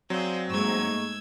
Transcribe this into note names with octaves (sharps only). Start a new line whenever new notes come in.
F#3 C4 G#4 C5 D5 F5
G#2 A3 A#3 D#4 G#4 C#6 E6 G#6